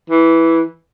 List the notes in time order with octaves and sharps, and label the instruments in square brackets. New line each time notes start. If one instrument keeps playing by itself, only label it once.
[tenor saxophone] E3